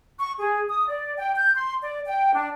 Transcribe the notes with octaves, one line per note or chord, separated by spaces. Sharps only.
C#6
G#4
D#6
D5
G5
G6
C6
D5
G5
D4